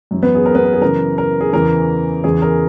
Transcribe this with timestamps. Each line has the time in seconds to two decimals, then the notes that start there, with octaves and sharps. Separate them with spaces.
0.11 F#2 E3
0.23 B3 B4
0.35 G#4
0.46 A#4
0.55 B3 B4
0.65 A#4
0.73 G#4
0.81 F#2 C#3 E3 A#4
1.18 A#4
1.41 G#4
1.53 E2 C#3 E3 A#4
2.24 E2 C#3 E3 G#4
2.42 A#4